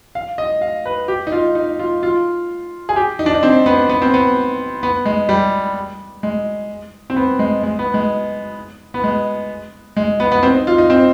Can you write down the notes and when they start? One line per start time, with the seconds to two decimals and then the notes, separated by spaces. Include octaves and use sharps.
0.15 F5
0.38 D#5
0.61 F5
0.85 B4
1.08 G4
1.27 D#4
1.32 F4
1.55 D#4
1.79 F4
2.03 F4
2.89 G#4
2.96 G4
3.19 D#4
3.26 D4
3.34 D#4
3.43 C4
3.66 B3
3.89 B3
4.02 C4
4.14 B3
4.83 B3
5.05 G#3
5.29 G3
6.23 G#3
7.10 C4
7.16 B3
7.39 G#3
7.63 G#3
7.79 B3
7.94 G#3
8.94 B3
9.04 G#3
9.97 G#3
10.20 B3
10.32 B3
10.43 C4
10.55 D#4
10.67 F4
10.78 D#4
10.90 C4